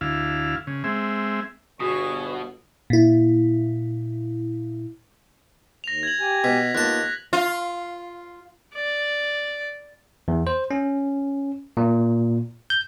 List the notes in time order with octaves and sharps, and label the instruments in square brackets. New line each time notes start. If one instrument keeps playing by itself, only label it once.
[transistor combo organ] D2 E4 F5
C#3
G#3 C4 E5
[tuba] G1 [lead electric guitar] B2 [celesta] F#4 D#6 [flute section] G#4 C#6
[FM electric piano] A#2 E4
[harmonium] D#2 [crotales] A#6 F7
[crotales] G#6 F#7
[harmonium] G4 G#5
[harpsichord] B2 [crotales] B6
[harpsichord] D#2 A5 [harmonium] B3 F4 [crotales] F#6 A#6
[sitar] F4
[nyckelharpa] D5
[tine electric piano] E2
C5
C#4
A#2
G6